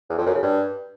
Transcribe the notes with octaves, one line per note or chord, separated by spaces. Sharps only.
E2
F2
F#2
C#3
G2